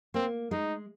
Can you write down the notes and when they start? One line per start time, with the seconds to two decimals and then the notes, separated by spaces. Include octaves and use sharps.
0.14 A#3 C4
0.51 G#3 D#4